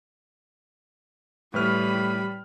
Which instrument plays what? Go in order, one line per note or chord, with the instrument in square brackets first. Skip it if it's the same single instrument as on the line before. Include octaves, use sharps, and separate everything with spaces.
[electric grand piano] A2 B4 F6 [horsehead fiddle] G3 B5